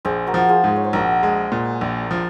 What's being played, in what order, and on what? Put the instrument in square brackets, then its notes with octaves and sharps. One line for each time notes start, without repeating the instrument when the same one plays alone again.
[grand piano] A#1 [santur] G#4 C5
[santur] F#4 A#4
[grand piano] F3
[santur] F4 G#4
[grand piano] G#2
[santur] C#5
C5
[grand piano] A#1 [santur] F#4 A#4
[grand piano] G#3
A#2
A#1
F3